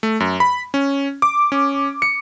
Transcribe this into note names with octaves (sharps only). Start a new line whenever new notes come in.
A3
F#2
B5
C#4
D6
C#4
C#7